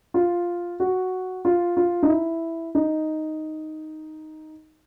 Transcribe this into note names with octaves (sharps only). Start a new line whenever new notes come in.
F4
F#4
F4
F4
D#4
E4
D#4